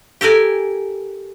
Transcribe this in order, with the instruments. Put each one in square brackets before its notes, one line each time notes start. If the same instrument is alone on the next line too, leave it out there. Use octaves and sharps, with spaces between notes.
[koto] G4 A4 A#4 G#5